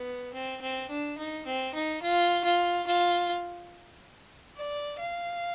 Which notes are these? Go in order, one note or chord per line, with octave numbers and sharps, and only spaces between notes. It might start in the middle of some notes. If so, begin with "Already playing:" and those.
Already playing: B3
C4
C4
D4
D#4
C4
D#4
F4
F4
F4
D5
F5